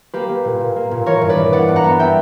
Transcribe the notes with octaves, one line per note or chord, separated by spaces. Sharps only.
A#3 G4 B4
A#3
A#2
A#2
A#3
A#2
E3 A#4 C#5
G2
B4 D5
E3
B3 D5 F#5
G2
F#5 A#5
B3
E5 G5